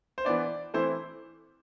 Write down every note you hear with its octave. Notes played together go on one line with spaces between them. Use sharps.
C5
E3 B3 D4 D5
E3 A3 C4 E4 C5